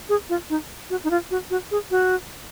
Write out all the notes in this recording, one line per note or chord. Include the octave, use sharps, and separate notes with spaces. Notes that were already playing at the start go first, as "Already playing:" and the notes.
G#4
F4
D#4
F#4
D#4
F4
F#4
F#4
G#4
F#4